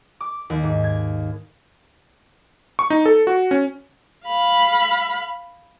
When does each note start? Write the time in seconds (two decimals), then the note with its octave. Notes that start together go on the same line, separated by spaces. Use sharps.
0.20 D6
0.50 D#2
0.63 G#2
0.84 G#6
2.79 C#6
2.90 D#4
3.06 A4
3.27 F#4
3.51 C#4
4.26 F5 B5